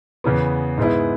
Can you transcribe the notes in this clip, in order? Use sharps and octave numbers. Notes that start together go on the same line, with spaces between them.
E2 C#3 E3 B3
G#2 G#3 B3 E4